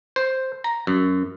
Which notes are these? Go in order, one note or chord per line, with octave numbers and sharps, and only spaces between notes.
C5
A#5
F#2